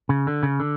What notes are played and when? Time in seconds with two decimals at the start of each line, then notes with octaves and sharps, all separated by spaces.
0.09 C#3
0.27 D3
0.43 C#3
0.60 D3